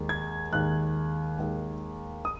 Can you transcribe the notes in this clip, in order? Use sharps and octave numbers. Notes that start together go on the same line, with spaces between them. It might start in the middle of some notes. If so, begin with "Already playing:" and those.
Already playing: D#2 D#3 G#3
G#6
D#2 D#3 G#3 F#6
D#2 D#3 G#3
D#6